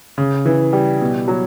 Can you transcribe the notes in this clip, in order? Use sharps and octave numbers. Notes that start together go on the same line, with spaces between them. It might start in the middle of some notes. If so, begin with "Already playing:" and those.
C#3
E3
G3
B2
F#3